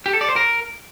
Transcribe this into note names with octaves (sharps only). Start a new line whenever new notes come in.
G4
A4
D5
C5
A#4